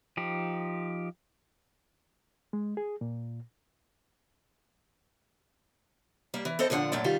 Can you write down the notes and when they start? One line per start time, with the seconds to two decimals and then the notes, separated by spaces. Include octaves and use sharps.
0.17 F3 D#4 G4
2.53 G#3
2.77 G#4
3.01 A#2
6.34 G3 A#3
6.45 E3
6.59 C4 D#4 A4 C5
6.70 A#2 D3 F3 D4 F#5
6.92 F#2 A#2 A3 D5
7.04 D#3 G3 F4